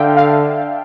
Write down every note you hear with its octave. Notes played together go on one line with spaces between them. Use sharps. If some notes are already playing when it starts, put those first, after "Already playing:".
Already playing: D3 E5 F5 G5 A5
F5